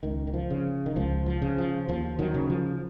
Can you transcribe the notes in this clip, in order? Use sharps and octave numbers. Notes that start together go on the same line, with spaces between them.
C#2 D#3
D#3
F3
C#3
D#3
C#2 F3
F3
C#3
F3
D#2 F3
D#3 F#3
C#3
F3